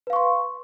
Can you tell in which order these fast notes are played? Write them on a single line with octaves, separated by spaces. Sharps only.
B4 F5 C#6 C6